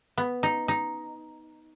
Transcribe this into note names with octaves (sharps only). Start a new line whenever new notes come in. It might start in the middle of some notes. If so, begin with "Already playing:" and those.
B3
D#4
D#4